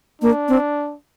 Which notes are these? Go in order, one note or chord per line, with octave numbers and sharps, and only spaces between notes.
A#3 D4
C4